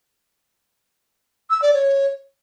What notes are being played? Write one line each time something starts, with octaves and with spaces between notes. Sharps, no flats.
E6
D5
C#5